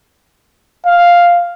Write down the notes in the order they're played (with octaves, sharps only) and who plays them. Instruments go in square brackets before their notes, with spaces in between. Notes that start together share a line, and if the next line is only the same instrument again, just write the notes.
[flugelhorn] F5